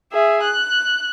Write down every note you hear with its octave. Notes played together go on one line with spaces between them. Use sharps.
G#4 E5
F#6